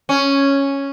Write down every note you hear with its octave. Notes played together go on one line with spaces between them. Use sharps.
C#4